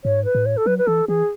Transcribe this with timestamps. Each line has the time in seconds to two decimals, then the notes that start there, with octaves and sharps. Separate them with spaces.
0.04 G#2 C#5
0.25 B4
0.35 A2
0.46 C#5
0.57 A4
0.66 F#3 B4
0.78 B4
0.87 E3 A4
1.08 E3 G#4